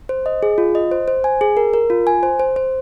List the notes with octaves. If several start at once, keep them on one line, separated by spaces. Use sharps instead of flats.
C5
D#5
G#4
F4
D#5
C5
C5
G#5
G#4
A#4
A#4
F4
G#5
C5
C5
C5